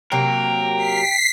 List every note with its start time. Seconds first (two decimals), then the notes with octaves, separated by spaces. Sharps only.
0.12 C3 F#3 A#3 A#4 G5
0.77 B6 C7